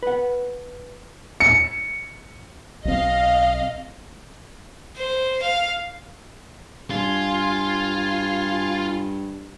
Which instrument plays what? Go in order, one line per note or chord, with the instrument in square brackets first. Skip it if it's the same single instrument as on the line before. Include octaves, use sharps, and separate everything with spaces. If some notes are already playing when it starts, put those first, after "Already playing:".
[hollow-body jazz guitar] B4 F#5
[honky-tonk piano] C#7
[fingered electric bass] B1 C4 [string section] D#5 F5
[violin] C5
F5
[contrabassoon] G2 [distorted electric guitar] F4 [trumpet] G#5